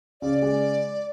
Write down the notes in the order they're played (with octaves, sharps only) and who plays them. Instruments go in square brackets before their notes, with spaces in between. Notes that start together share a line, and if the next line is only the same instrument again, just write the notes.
[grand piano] C#3 [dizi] D5
[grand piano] G#3